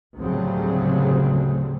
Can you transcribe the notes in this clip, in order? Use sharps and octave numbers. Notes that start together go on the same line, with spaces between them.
D2 A2 C#3 F#3 G3 C4